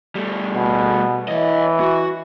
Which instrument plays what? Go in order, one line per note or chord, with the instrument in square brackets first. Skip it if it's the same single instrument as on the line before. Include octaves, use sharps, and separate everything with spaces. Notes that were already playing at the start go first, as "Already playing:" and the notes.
[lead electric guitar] G3 A3
[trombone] B2
[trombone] E3 [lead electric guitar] C#5 D#5
[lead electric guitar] F#4